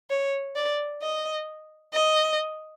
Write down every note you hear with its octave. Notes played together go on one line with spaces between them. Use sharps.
C#5
D5
D#5
D#5